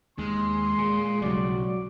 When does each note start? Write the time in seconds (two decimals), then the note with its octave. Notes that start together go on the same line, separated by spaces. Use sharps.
0.18 D#2 G#3 C6
0.78 A#2 G#4
1.22 B1 C#3 F#3 G3 D5